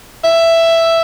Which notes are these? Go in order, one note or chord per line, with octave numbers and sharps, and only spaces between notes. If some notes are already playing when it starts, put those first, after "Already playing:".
E5